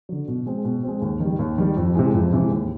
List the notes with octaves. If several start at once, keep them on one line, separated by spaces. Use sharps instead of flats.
D3 F#3
B2
G#3 C4
B2
G#3 C4
D#2
D#3
G3
D#2
D#3 G3
F2
C3 E3 G#3
F2
C3 E3 G#3
D#2